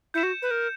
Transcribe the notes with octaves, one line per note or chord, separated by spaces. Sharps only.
E4 G6 C#7 E7
F#4
B4
A#4